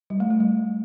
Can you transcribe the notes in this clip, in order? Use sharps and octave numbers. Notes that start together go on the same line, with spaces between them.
G3
A3
A3
G3